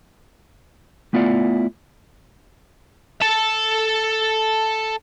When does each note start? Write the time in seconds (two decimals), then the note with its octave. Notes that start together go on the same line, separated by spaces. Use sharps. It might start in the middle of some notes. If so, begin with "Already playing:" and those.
1.13 A3 B3 E4 F4 D5 F#5
3.22 A4 A5